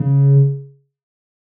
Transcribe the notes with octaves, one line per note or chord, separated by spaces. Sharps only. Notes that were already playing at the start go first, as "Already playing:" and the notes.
Already playing: C#3